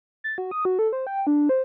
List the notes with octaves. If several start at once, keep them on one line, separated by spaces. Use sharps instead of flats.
A6
F#4
D#6
F#4
A4
C5
G5
D4
C5